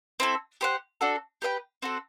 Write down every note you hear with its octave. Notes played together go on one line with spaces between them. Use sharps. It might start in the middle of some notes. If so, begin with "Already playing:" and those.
C4 E4 A4
G4 C5 F#5
D4 F#4 A4
G4 B4 E5 G5
C4 F#4 A4